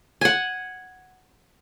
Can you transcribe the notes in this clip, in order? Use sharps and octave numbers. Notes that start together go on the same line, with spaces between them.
F#5 G#5